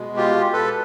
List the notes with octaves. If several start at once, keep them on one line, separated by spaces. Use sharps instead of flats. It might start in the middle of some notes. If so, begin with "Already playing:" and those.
Already playing: B2 G#3
F4 G4
A4 B4